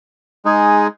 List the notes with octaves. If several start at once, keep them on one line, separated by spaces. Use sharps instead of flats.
G#3 D#4 G#4